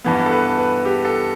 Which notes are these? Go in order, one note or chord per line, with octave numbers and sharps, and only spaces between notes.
G2 E3 B3
A4
B4
B4
G4
A4